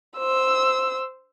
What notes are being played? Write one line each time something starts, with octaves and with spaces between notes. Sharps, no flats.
C5 E6